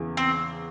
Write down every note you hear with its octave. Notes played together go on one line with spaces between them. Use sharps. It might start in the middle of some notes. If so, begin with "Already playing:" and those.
Already playing: E2 C#3 E3
C4